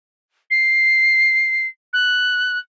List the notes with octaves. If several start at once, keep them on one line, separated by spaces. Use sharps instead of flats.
C7
F#6